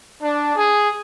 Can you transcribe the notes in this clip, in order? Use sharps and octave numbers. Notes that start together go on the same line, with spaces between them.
D4
G#4